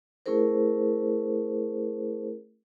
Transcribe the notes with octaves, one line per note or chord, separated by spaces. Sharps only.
A3 C#4 E4 G#4 A#4 C5